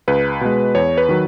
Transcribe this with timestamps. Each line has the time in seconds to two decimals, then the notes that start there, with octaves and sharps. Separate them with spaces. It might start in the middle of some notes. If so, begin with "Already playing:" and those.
0.08 C#2 B4
0.41 B2 G#3
0.75 E2 C#5
0.98 B4
1.09 D#3 F#3